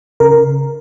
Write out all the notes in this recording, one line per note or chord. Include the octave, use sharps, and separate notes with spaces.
C#3 A#4